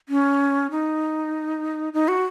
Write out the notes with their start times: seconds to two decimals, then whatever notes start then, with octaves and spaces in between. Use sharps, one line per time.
0.09 C#4
0.71 D#4
1.93 D#4
2.08 F#4